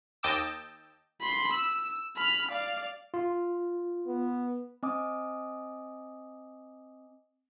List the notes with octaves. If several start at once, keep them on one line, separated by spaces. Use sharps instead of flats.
D#2 D#5 G5 A5 D6 E6
B5 C6
E6
B5 F6
D5 F5
F4
B3
C4 D#5 G#5 D6 D#6